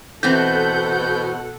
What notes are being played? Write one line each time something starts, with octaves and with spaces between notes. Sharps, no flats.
B2 E3 B3 C4 A4 F#5 G6